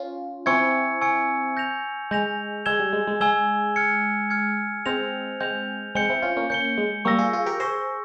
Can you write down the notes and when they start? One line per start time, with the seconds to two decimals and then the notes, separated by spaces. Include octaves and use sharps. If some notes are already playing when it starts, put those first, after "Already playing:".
Already playing: C#4 F4
0.46 C4 E4 G#5 C#6 E6 G#6 C#7
1.01 G#5 C#6 E6 G#6 C#7
1.57 G6 A#6 F7
2.11 G#3 G6 A#6 F7
2.66 G#3 G#5 E6 G#6 E7 G7
2.80 G3
2.93 G#3
3.07 G#3
3.21 G#3 G#5 E6 G#6 E7 G7
3.76 F6 G#6 C#7
4.30 F6 G#6 C#7
4.86 G#3 C4 G6 A#6 F7
5.41 G#3 C4 G6 A#6 F7
5.95 G#3 C4 G6 C#7 G7
6.10 C4 E4
6.22 C#4 F4
6.37 A#3 C#4
6.50 A#3 C#4 G6 C#7 G7
6.78 G#3
7.05 G3 A#3 C#6 E6 A#6
7.19 F4 G#4
7.33 F4 G#4
7.46 G4 A#4
7.60 G#4 C5 C#6 E6 A#6